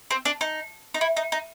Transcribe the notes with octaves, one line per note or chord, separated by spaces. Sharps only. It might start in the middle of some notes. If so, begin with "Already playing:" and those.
C4
D4
D#4
D#4
E4
D#4
D#4